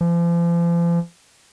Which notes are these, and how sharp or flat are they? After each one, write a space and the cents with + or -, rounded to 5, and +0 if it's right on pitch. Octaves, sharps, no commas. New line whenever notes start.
F3 -40